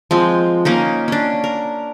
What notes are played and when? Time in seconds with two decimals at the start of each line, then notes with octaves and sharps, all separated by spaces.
0.11 F3 G#3 C4
0.65 A#3 C#4 D#4
1.08 C#4 D4
1.44 A#4